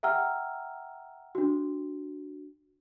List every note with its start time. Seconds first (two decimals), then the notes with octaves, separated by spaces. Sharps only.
0.03 E5 F#5 G5 A#5 E6 F6
1.35 D4 F#4